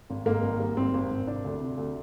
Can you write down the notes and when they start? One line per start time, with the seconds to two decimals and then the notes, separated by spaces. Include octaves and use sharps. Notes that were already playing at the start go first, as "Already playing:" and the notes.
0.10 G#1
0.26 G#2 A#3
0.43 G#1
0.60 G3
0.77 G#1 C4
0.94 G#1
1.11 G#1
1.27 C3 D4
1.44 D2
1.61 C3
1.78 D2